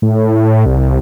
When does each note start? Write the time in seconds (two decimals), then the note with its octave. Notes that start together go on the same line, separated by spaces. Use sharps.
0.02 A2
0.66 C2